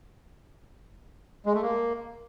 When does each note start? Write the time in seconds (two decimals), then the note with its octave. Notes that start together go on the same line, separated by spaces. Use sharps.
1.46 G#3
1.54 A3
1.62 A#3